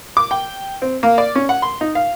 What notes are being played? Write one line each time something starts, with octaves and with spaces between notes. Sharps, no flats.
D6
G5
C4
A#3
D5
C#4
F#5
C6
D#4
F5